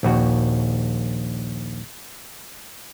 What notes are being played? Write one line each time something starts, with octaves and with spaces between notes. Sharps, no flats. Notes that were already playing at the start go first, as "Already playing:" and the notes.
A#1 D#2 F#4